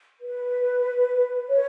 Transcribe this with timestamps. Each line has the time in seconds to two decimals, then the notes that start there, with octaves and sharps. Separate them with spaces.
0.20 B4
1.49 C#5